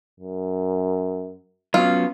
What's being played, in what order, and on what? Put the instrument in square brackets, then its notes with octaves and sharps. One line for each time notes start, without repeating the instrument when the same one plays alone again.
[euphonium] F#2
[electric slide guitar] F#3 B3 C#4 [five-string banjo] F4